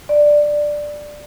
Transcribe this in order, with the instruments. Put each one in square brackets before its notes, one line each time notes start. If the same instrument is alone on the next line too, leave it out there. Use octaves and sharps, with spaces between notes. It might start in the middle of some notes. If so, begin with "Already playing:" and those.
[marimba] D5